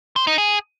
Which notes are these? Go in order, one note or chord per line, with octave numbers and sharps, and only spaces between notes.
C5
D#4
G#4